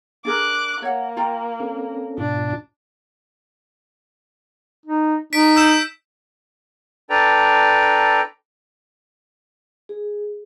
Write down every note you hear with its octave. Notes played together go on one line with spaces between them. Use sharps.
D4 G#4 A#4 D6 F#6
A#3 C#5 F#5
F4 G5 A#5
C4 C#4 A4
G#2 B2 D4 F4
D#4
D#4 B6 D7
E6 G6 E7
D4 A4 B4 D5 G5 A#5
G#4